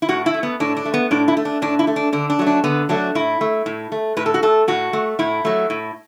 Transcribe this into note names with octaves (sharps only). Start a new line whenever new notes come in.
E4
A2 F#4
E4
A3
B3
A2 D4
D4
A3
B3
A2 D4
E4
A3
D4
A2 D4
E4
A3
D4
D3 D4
D4
F#3 A3
D4
D3 B3
F#3 A3 D4
A2 E4
A3
A2
A3
A2 B4
A4
F#4
A3 A4
A2 F#4
A3
A2 E4
F#3 A3
A2